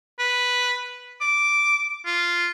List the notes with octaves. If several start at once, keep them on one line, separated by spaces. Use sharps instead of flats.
B4
D6
F4